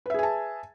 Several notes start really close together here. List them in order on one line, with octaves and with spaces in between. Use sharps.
B4 E5 G#4 G#5 A5